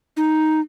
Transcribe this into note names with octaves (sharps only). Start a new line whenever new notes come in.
D#4